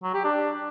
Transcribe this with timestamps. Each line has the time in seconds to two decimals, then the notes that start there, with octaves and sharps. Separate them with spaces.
0.03 F#3
0.14 G4
0.24 D4